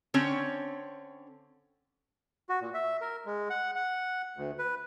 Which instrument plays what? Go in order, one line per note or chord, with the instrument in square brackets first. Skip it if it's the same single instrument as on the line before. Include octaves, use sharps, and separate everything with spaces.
[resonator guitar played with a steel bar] D3 C4 C#4 C#5
[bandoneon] F#4
A#2
E5
A#4
G#3
F#5
F#5
D2
B4